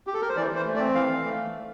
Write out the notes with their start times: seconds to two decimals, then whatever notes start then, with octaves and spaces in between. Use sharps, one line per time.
0.07 G4
0.14 A4
0.22 A#4
0.29 C5
0.37 E3 D5
0.51 E3 C5
0.66 A3
0.76 D5
0.79 C4
0.95 E3 F5
1.09 E3
1.24 A3